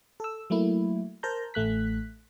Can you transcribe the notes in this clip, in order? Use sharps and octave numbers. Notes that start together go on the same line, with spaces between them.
A4 E6
F#3 A3 A#3 E4
A#4 C5 A5 A#5 G6
A1 A3 F#6 B6